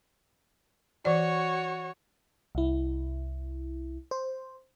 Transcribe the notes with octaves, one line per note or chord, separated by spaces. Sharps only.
E3 F#4 C#5 D5
C2 E4
C5